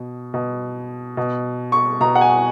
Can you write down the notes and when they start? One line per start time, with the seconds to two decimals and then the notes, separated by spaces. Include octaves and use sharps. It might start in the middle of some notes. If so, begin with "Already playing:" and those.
Already playing: B2
0.34 B2
1.17 B2
1.72 C#6
2.00 B2 A#5
2.15 F#5
2.21 G#5